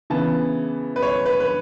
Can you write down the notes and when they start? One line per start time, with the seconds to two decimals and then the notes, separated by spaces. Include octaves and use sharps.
0.10 C#3 E3 B3 A5
0.96 B4
1.03 C#5
1.26 B4
1.40 B4